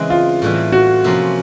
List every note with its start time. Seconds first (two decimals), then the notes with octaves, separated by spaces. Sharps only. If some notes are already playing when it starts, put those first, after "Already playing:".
Already playing: C#3 E3 G#3 C4
0.10 F4
0.42 A2 E3 G3
0.72 F#4
1.04 C3 F3 A#3 C#4